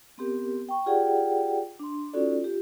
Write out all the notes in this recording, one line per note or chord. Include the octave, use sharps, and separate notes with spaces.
B3 C4 G4 A#4
G5 C#6
F4 G4 G#4 D5 F#5 G5
D4 C6
C#4 D#4 F4 F#4 A4 D5
F4 G4